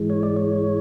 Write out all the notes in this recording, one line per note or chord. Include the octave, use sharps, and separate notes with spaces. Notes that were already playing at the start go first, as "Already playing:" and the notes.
Already playing: G#2 E3 G#3
C#5
D5
C#5